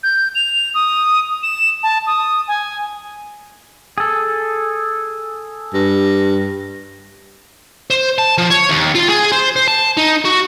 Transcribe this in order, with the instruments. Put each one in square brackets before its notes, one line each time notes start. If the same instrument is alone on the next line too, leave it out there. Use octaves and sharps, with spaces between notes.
[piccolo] G6
F7
D#6
E7
A5
D#6
G#5
[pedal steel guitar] G#4 A4
[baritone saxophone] G2
[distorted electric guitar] C5
A5
F3
C#5
D#2
F4
G#4
C5
C5
A5
D#4
F#4